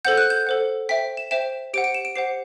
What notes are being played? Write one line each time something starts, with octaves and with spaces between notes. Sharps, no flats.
A4 C5 F#5 G6
F#6
G6
A4 C5 F#5
C5 E5 G5 B6
E7
C5 E5 G5 E7
G4 C5 F#5 D7
D7
E7
D7
G4 C5 F#5 C7